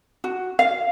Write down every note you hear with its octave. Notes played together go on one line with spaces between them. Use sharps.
F#4
F5